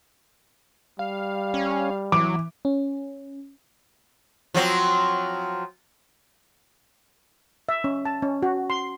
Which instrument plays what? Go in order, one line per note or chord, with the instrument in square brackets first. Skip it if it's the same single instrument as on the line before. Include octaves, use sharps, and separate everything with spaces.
[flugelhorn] G3 [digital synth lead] F5
[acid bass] C#4
[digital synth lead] E3 [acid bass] F#3 [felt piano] D6
[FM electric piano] C#4
[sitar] F3 F#3 C4
[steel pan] E5
C#4
A5
C#4
F#4
C6